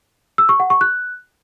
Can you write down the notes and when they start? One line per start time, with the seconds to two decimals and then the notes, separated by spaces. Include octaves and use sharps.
0.38 E6
0.49 C#6
0.60 F#5
0.70 C#6
0.81 F#6